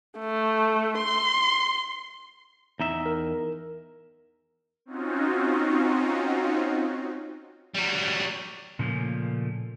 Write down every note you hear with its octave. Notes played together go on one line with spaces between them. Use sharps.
A3
C6
E2 D#4 E5
A#4
C4 C#4 D#4 F4 F#4
F#3 G3
A#2 C#3 F3 A3 A#3 C#4